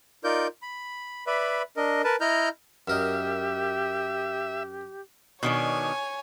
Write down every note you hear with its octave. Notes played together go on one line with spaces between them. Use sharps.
D#4 F4 A#4 D5 G6
B5
B4 D5 E5 B5
D4 A#4 D#5
A#4 B4 A5
E4 D#5 A#5 F6 G6
F#2 G4 A#4 D#5 E5
B2 D#3 D4 C#5 G#5